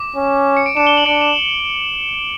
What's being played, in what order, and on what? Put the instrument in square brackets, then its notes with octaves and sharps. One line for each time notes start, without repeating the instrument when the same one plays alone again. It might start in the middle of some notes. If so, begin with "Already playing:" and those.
Already playing: [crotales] D6
[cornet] C#4
[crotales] C#7
D7
[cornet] D4 [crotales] E7
[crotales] G7
F#7
[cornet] D4 [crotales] D7
[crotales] E7